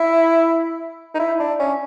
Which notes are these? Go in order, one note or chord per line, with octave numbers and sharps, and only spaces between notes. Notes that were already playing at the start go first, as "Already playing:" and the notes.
Already playing: E4
D#4
E4
D4
C#4